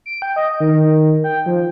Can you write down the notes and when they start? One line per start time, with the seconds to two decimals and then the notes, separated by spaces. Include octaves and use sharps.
0.06 D7
0.22 G5
0.36 D#5
0.60 D#3
1.24 G5
1.46 F3